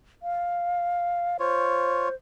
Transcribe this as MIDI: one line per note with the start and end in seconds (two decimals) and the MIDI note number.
0.23 1.37 77
1.40 2.09 65
1.40 2.15 72
1.40 2.09 73